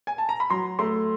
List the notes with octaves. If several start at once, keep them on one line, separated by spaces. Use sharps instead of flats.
G#5
A5
A#5
B5
F#3 A#5 C6
A3 A#5 C6